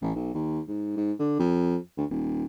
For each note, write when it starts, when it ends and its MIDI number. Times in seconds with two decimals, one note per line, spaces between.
0.02 0.10 33
0.15 0.31 35
0.34 0.60 39
0.68 0.93 44
0.96 1.12 44
1.19 1.38 50
1.39 1.77 41
1.97 2.05 38
2.10 2.44 27